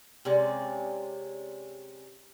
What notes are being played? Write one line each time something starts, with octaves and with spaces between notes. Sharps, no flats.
C3 G#3 C#4 D5